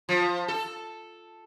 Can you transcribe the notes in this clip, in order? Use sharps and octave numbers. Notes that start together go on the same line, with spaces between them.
F3
A4